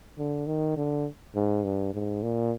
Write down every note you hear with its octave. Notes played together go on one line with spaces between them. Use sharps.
D3
D#3
D3
G#2
G2
G#2
A#2